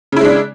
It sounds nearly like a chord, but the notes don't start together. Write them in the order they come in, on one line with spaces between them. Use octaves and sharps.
C#3 E4 G#3 D4